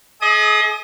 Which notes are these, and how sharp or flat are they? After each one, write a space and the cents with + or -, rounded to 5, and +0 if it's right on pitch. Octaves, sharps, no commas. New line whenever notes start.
G#4 +35 D#5 +40 D#6 -20